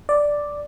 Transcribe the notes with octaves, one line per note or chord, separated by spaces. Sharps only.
D5